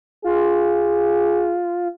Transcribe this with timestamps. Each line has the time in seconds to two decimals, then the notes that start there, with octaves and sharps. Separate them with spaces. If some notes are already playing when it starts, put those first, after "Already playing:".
0.24 F4 G#4